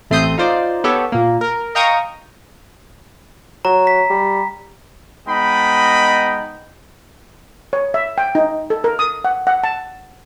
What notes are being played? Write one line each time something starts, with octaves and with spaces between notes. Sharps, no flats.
A1 A3 C4 C6 D#6 G6
D#4 F4 C5 D5
B3 G4 A4 C#5
A#2 A#3
A#4
D#5 F5 G5 A#5 C#6 D#6
F#3 A#5
B6
G3
G#3 B3 D#4 D#5 G5 B5
C#5
E5
G5
D#4
A4
A#4
D#6
F#5
F#5
A5